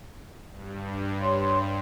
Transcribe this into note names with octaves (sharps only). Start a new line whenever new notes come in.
G2
C#5 C6